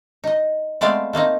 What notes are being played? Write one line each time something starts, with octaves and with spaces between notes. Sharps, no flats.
D#4 D#5
G#3 A3 B3 C4 D5 F5
A3 A#3 C4 D#4